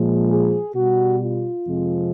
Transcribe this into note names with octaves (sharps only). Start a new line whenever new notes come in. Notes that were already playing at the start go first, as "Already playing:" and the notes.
Already playing: A#2 F3 G#3
G#4
B2 G3 F#4
F4
F2 C3 F3 G#3